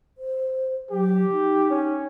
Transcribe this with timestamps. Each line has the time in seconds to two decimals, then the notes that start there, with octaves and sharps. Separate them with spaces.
0.18 C5
0.91 F#3 G4
1.32 D#4
1.70 C#4